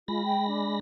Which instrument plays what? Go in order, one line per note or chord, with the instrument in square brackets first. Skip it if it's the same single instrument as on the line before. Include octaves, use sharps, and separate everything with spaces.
[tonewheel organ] G#3 B5 A#6 [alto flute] F4
[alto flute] G5
D4